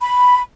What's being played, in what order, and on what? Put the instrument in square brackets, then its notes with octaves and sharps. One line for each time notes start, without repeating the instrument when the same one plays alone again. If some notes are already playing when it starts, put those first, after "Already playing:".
[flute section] B5